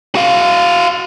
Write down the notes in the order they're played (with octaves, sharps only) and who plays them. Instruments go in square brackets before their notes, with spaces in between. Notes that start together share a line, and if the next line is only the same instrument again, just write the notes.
[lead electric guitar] F#4 F5